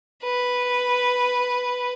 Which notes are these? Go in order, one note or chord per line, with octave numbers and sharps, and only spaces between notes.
B4